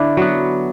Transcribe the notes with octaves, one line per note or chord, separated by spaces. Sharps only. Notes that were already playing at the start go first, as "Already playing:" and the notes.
Already playing: D3 D4 E4
F#3 B3